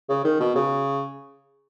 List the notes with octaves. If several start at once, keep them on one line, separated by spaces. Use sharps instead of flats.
C#3
D#3
B2
C#3